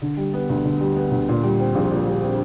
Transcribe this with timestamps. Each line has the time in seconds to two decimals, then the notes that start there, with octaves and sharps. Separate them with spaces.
0.02 D3
0.17 G3
0.33 B3
0.49 D2
0.65 D3
0.81 G3
0.96 B3
1.11 D2
1.28 A#2
1.43 G3
1.60 C4
1.75 A#1
1.91 A#2
2.06 G3
2.23 C4